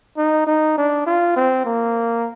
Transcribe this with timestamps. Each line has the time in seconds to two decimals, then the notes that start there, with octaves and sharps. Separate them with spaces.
0.18 D#4
0.47 D#4
0.78 D4
1.06 F4
1.36 C4
1.65 A#3